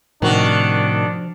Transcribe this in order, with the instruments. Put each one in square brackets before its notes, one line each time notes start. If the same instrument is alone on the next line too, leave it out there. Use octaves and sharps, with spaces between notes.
[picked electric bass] A2 C3 [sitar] D#3 F#4 [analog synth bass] F3 [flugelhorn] D4